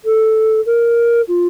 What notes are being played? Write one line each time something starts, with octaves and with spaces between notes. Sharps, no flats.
A4
A#4
F4